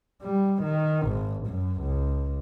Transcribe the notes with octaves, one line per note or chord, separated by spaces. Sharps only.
G3
D#3
G#1
F#2
C#2